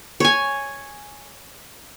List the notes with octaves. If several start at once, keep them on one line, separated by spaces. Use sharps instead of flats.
C#5 G#5